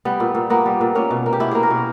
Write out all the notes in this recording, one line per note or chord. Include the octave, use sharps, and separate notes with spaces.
G3 B3
A#2
A#2
A#3 B3
G3
A#2
A#3 C#4
B2
A#3
G4
B2 E4
A#3 G#4
A#4
B2